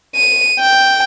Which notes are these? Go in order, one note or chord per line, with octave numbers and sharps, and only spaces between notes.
D#7
G5